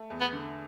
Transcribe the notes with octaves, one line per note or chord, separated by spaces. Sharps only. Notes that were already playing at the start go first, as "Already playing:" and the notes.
Already playing: A3
E2
B3
D3